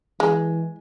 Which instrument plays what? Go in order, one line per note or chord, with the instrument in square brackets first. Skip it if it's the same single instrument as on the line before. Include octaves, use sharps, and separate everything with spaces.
[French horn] E3 [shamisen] G#3